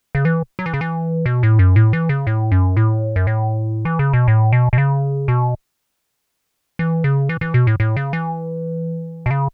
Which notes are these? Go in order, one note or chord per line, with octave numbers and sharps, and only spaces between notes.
C#3
E3
F#3
E3
C#3
E3
B2
A2
F#2
A2
E3
C#3
A2
F#2
A2
F#2
A2
E3
C#3
B2
A2
B2
B2
C#3
B2
E3
C#3
E3
E3
B2
A2
A2
C#3
E3
B2
C#3